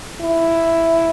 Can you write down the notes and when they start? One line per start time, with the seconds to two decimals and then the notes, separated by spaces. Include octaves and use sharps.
0.21 E4